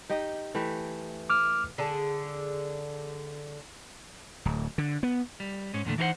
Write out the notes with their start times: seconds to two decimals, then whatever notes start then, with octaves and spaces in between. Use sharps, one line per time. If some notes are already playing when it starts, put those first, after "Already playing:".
0.10 D#4 G4 D#5
0.55 E3 A3 G4
1.30 D6 F6
1.78 D3 G#4 A5
4.45 D1
4.78 D3
5.03 B3
5.40 G3
5.73 G#2 G#3 C#4
5.85 E2 A#2 D3 A3
5.98 E3 D#4 F#4 A#4 C5 F#5